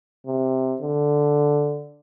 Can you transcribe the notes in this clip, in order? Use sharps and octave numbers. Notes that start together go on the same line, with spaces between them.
C3
D3